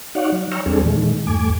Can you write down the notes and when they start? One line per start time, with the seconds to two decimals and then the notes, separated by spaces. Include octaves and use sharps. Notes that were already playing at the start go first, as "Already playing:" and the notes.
0.15 D#4 F#4 C#5 D5 F5 F#5
0.32 F#3
0.52 C#5 G5 A#5 C#6 E6 F6
0.66 E2 G3 C4 D4 G#4 A4
0.85 A#2 D#3 E3 G#3
1.27 E2 G2 A3 G#5 D6